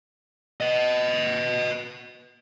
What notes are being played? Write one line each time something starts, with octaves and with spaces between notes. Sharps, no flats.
B4 D#5